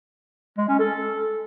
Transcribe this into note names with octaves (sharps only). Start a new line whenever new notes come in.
G#3
C#4
A4